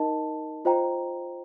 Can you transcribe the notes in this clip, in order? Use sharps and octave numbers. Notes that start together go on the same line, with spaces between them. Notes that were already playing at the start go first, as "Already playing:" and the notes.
Already playing: D#4 A#4 D#5 A5
F4 C5 D#5 G5 A#5